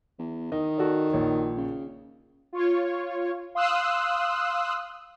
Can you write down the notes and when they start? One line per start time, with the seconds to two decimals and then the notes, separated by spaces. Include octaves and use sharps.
0.19 E2
0.52 D#3 D#5
0.78 F#4 A4 D5
1.13 A#1 C#5
1.57 C#3
2.53 F4 C#5
3.55 F5 C6 D#6 E6 F#6